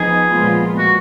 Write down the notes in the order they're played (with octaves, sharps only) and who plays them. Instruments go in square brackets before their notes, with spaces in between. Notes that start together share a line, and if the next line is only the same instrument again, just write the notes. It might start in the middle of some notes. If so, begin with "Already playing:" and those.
Already playing: [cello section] F3 B3 D#4 [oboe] G#4
[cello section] A#2 F3 G#3 B3 F4
[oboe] F#4